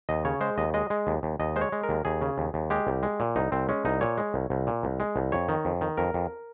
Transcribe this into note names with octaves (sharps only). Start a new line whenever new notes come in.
D#2 D#5
C#3 C#5
G#3 C5
D#2 D#5
G#3 D#5
G#3
D#2
D#2
D#2 D#5
G#3 C5
C#5
G#3
A#4
D#2
D#2 G#4
C#3
D#2
D#2
G#3 G4
C2
G#3
A#2
C2 D#4
C2 C4
G#3 C#4
C2 D#4
A#2 C#5
G#3
C2
C2
A#2
C2
G#3
C2
F2 C#5
D#3
F2
D#3
F2 A#4
F2